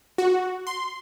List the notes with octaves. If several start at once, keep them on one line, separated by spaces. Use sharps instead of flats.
F#4
C6